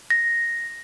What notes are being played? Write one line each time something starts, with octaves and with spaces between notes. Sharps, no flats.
A#6